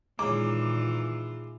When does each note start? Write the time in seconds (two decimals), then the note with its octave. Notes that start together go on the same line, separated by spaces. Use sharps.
0.19 A#2 D#3 E3 G#3 C#4 F4 D6